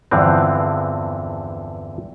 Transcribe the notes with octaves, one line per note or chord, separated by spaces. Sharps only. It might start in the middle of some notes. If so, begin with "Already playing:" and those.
E2 G2 D3 E3 F3 C4